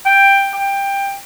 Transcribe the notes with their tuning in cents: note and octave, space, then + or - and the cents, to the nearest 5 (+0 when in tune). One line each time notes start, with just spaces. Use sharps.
G5 +5
G5 +15